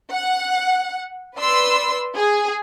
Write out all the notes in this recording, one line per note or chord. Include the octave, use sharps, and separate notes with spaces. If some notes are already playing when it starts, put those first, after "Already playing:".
F#5
B4 D5 C6 E6
G#4